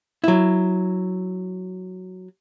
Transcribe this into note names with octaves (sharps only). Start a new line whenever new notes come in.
F#3 E4